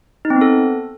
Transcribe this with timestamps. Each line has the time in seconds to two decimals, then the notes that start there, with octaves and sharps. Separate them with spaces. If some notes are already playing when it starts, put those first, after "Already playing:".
0.25 D#4
0.30 C4
0.36 B3
0.41 A4